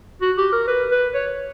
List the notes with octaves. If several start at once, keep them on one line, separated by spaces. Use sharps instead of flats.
F#4
G4
A#4
B4
B4
C#5